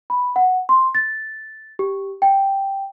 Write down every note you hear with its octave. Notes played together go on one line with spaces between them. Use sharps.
B5
F#5
C6
A6
G4
G5